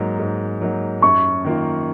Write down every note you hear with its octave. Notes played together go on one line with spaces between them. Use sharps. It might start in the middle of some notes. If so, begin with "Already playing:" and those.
Already playing: G#2 F#3 A#3 D#4
G#2
F#3 A#3 D#4
F#2 C#6
D#3 A#3 F4